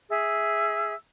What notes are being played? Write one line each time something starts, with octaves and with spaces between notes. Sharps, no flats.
G#4 E5 E6